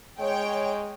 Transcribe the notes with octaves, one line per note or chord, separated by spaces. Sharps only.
G#3 C#5 G5